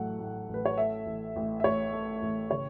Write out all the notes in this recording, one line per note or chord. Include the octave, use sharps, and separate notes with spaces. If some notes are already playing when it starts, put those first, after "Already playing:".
Already playing: A1 A2 F#3 A3 F#5
A2
A1
B4
C#5
A3 E5
A1
A1
E5
A1 C#5
A3
A1
C#3 C#5